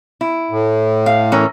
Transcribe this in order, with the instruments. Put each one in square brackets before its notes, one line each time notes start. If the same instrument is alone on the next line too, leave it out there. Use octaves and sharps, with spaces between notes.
[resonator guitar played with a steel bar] E4
[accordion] A2
[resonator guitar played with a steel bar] F5
E3 C#4 A#4